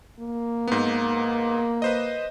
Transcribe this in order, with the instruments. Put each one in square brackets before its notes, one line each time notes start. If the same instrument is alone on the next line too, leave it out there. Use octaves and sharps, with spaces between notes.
[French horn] A#3
[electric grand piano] G#2 B3
B4 C5 D#5